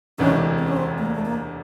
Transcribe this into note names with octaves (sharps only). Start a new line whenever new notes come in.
E1 D2 C3 E3 G#3 C#4
C4
C#4
C4
A3
A#3
A3
A#3